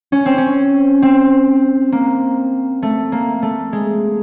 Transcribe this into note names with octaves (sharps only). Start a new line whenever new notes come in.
C#4
C4
C#4
C4
A#3
A3
A#3
A3
G#3